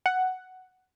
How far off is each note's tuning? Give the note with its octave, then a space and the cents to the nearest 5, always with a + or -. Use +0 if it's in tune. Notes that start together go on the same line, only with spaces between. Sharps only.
F#5 +5